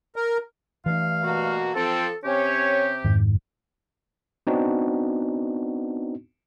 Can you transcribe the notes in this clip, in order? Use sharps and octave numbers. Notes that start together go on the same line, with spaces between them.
A#4
G2 E3 A3 D4 F5
B2 A#3 F#4
F3 C4 A4
C3 C4 C#4 G4 C#5
F2 G#2 D#3
B3 C4 D4 D#4 F#4